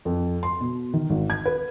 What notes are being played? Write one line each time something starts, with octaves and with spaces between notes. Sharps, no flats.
F2
C6
B2
D#3
G#1
G#6
B4